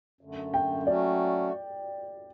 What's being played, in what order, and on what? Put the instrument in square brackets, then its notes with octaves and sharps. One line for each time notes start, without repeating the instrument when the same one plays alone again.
[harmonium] F#2 D3 A3
[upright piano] G5
[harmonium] F#3 A3 C#4 F#4 [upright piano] D5